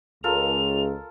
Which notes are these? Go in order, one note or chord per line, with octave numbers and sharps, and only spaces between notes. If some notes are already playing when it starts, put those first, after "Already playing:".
C#2 F4 A4 A#4 F7